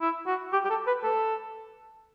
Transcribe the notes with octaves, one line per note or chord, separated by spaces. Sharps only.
E4
F#4
G4
G4
A4
B4
A4